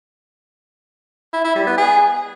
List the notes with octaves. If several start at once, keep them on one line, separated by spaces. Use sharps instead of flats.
E4
E4
G3
B3
G#4